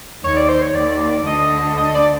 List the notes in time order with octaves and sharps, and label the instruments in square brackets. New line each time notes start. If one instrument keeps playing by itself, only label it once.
[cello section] D#2 D#3 [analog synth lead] C#5
[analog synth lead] D5
C5
C#5
[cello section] D#2 D#3 [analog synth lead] D5
[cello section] D2 D3 [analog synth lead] D#5
[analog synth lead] D#5
D5